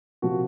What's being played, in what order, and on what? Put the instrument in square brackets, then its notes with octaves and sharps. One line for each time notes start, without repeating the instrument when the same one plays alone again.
[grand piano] C3 F3 A#3 F#4